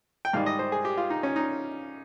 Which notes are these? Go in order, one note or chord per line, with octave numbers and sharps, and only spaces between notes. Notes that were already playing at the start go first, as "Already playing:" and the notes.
G5
G#2 D#3 G3 F5
D#5
C5
G#4
G4
F4
D#4
C#4
D#4